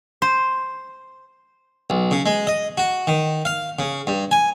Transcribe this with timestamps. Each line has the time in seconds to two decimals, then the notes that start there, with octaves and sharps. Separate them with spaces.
0.22 C5
1.90 B1
2.11 C#3
2.26 G#3
2.47 D#5
2.78 F#4
3.07 D#3
3.45 F5
3.79 C#3
4.07 G2
4.31 G#5